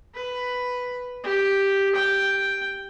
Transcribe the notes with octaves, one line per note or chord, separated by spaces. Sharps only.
B4
G4
G5